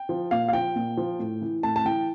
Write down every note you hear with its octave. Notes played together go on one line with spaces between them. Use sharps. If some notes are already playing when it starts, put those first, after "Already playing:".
Already playing: G5
F3
A#2 F5
F5
F3 G5
A#2
F3
A2
E3
A2 A5
A5
E3 G5